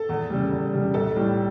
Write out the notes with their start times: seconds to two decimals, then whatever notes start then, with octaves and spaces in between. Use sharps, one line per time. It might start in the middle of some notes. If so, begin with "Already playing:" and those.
Already playing: A4
0.09 E2
0.30 C#3 G3
0.51 E2
0.73 C#3 G3
0.94 B1 A4
1.16 A2 G3